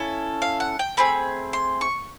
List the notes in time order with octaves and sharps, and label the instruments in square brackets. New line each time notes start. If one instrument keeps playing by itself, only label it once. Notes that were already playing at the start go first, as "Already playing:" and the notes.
Already playing: [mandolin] C#4 E4 A4 F5
F5
F#5
G5
A3 C4 G#4 B5
C6
C#6